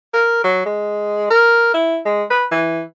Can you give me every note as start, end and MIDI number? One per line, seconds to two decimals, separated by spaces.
0.14 0.42 70
0.44 0.64 54
0.66 1.27 56
1.30 1.74 70
1.74 1.99 64
2.05 2.24 56
2.30 2.45 71
2.52 2.82 52